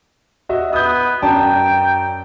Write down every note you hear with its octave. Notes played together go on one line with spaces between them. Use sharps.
F#4 D#5 E5
B3 D#6 G6
F#2 D5 G5 A5